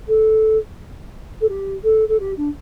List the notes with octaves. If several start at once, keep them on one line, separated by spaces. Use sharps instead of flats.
A4
A4
G4
A4
A4
G4
D4